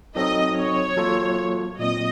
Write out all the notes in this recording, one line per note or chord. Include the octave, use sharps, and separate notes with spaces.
F#3 C4 D#4 A4 D#5
C#5
F#3 A#3 F4 A4
A#2 F#3 C4 D#5